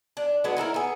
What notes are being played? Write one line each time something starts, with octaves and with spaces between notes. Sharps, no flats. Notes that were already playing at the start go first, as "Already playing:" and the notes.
D4
F#3 G#3 B3 D4
D#4 E4 G#4 A#4
B3 G#4